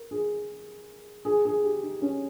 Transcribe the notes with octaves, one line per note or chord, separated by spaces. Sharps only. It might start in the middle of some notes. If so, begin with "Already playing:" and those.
Already playing: A#4
G#4
G#4
G#4
G4
D#4
C#4